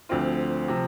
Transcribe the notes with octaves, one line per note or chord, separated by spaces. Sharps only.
D2 D3 F3 C4 F4
C3 F3